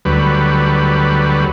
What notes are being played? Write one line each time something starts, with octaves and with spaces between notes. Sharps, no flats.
D2 F#3 G3 B4